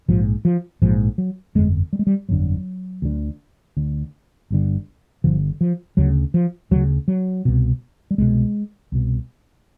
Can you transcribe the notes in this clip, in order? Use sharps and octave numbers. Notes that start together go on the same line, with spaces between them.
A#1 G#2 F3
F3
A#1 G#2 F3
F#3
G1 F2 D3 G#3
G3
G#3
G3
G1 F2 D3 F#3
D2 D3
D2 D3
G1 G2 D3
G1 G2 D3 F3
F3
D2 C#3 F#3
F3
D2 C#3 F#3
F#3
C2 B2
G3
C2 B2 G#3
C2 B2